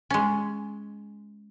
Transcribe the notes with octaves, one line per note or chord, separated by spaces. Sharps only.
G#3 C#4